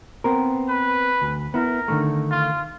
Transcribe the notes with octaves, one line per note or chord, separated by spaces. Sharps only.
B3 C4 A#4
B4
D2
B3 E4 A#4
D3 D#3 A3
F4